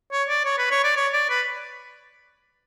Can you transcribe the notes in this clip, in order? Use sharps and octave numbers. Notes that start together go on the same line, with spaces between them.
C#5
D5
C#5
B4
C#5
D5
C#5
D5
B4